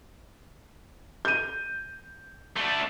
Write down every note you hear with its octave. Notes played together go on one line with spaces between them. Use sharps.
G6 D#7
A3 D4